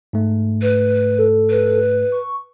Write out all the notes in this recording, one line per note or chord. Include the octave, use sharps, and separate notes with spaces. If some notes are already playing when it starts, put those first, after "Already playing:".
G#2 A3
B4
A4
B4
C#6